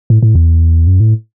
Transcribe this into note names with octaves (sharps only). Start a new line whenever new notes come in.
A2
A2
E2
F#2
A2